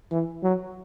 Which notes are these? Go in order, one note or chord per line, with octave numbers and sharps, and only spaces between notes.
E3
F#3